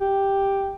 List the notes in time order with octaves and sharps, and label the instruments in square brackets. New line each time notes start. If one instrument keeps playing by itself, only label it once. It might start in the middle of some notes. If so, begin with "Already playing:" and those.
[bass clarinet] G4